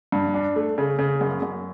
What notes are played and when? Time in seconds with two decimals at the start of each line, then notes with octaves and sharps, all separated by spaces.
0.12 G2
0.34 D4
0.56 A3
0.78 C#3
0.99 C#3
1.21 F#2
1.42 F#2